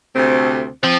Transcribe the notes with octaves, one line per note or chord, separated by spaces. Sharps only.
D2 C3 A3 C4
F3 C4